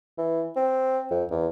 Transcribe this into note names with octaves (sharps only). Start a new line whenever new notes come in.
E3
C4
F2
E2